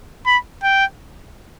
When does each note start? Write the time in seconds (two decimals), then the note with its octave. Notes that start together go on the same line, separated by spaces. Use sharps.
0.26 B5
0.63 G5